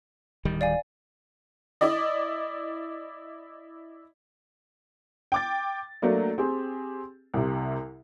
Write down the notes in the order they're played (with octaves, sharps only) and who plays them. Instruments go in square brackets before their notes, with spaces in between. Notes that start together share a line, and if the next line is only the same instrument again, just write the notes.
[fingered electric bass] D1 D#3 G3
[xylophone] D5 F5 G#5
[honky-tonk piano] E4 D5 D#5
G5 D6 A6
F#3 A3 A#3 D4
C4 G4 G#4
C2 C3